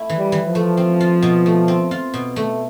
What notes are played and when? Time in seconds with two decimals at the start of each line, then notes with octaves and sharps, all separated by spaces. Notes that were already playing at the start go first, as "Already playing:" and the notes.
Already playing: A3 E4
0.10 E3
0.18 G3
0.32 E3
0.47 F3
0.55 A3
0.77 C4
1.00 F4
1.22 B2
1.46 A3
1.68 C4
1.91 F4
2.14 B2
2.36 A3